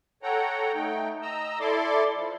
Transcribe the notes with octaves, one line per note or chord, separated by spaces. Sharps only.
A4 C#5 F#5 G5 A#5
A3 D#4 G5
D#5 A#5 E6
E4 A4 D5 C6 D6
F3